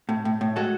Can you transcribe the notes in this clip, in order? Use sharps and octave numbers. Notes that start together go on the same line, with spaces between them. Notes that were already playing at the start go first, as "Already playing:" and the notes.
A2
A2
A2
G#3 F#4 A4